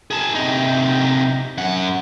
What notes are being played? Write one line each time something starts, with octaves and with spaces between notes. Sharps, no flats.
G#4 A5
C3 D#4
F#2 F#5